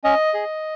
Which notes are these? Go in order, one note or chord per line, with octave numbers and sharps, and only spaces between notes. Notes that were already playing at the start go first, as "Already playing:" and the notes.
C#4 D#5
G#4